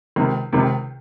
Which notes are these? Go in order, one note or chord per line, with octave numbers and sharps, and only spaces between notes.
C#2 C3 D#3
C#2 C3 D#3